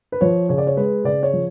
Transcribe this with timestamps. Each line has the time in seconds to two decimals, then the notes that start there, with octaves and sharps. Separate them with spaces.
0.12 B4
0.21 F3 C#5
0.49 C#3 C#5
0.58 D5
0.67 C#5
0.77 G#3 B4
1.04 C#3 D5
1.23 C#5
1.33 F3